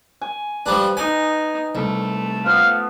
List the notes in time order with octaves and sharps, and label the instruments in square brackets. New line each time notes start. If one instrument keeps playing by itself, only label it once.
[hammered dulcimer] G#5
[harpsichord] F3 G3 D4 [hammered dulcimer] B4
[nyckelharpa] D#4 [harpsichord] G#5
[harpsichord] C2 [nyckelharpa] A3 A4
[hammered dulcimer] F3 B3 [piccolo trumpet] F5